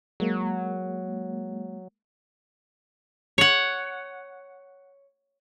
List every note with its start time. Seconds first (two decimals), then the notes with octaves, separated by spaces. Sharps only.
0.20 F#3 G#3 A#3
3.38 C#5 F#5